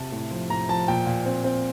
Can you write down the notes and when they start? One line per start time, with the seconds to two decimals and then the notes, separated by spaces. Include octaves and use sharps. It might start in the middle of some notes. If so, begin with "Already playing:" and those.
Already playing: C3 A5
0.12 A2
0.31 F3
0.49 A2 A#5
0.69 F3 A5
0.88 A#2 G5
1.06 A#2
1.26 C4
1.44 C4